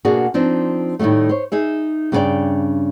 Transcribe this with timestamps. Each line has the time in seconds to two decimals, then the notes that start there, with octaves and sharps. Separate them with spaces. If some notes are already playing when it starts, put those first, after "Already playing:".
0.05 B2 A#3 D4 F#4 G#4
0.34 F3 C4 D4 D#4
0.99 A2 D#3 F#3 G3 A3
1.29 C5 C#5
1.52 D#4 G#4 E5
2.12 G2 C#3 B3 D4 D5 G5